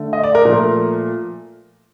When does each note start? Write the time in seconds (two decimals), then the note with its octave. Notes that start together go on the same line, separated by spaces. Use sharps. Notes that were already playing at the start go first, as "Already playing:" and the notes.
Already playing: D3 A3
0.13 D#5
0.23 D5
0.35 A#4
0.45 A#2 F3 A3 A#4